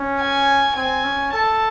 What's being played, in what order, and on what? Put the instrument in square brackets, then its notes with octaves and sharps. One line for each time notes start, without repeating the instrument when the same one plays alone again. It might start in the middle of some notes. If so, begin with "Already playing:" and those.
Already playing: [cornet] C#4
[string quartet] G#5
[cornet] C4 [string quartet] G#5
[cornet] C#4
[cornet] A4 [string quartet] A5